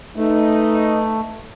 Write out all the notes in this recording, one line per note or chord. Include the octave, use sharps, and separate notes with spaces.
A3 D#4 B4